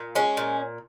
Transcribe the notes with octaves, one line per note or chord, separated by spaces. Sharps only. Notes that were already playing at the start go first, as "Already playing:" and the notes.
Already playing: A#2
G#3 C#4
A#2